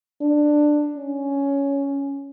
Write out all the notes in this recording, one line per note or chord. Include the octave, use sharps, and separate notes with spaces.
D4
C#4